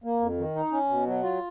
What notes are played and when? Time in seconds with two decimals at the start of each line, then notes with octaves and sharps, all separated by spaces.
0.04 A#3
0.21 F2
0.38 D#3
0.55 D#4
0.72 C#4
0.89 B2
1.07 F#3
1.23 F4